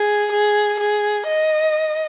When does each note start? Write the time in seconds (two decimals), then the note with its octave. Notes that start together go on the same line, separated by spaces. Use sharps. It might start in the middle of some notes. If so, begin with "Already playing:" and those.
Already playing: G#4
0.32 G#4
0.80 G#4
1.27 D#5